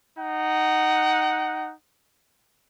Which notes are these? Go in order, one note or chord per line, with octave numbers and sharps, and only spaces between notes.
D#4 F#5